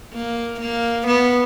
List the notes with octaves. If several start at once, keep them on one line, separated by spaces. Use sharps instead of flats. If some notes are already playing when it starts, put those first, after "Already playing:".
A#3
A#3
B3